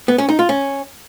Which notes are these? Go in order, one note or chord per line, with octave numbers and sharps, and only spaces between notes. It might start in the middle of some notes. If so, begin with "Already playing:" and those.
B3
C#4
D#4
F4
C#4